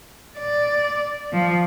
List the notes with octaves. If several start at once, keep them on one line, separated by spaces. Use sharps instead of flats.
D5
F3